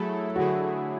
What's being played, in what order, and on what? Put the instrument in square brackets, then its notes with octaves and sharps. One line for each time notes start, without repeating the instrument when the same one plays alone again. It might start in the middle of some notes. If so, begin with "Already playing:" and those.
Already playing: [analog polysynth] F#3 A3 E4 A4 [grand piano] G#4
[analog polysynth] D3 F#3 A3 E4 G#4 [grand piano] F#4